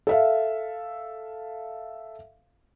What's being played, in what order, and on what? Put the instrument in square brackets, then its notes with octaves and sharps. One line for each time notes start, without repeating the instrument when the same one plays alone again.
[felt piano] A4 E5 F5